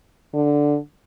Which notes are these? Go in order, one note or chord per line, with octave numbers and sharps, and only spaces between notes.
D3